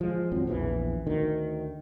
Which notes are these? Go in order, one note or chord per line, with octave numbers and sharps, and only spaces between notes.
F3 G#3
G#1 F2 F#3 C4
A#1 E2 D#3 E3
D2 D#3